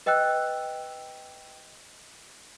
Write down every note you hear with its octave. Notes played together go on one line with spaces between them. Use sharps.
B4 D#5 G5 E6 F#6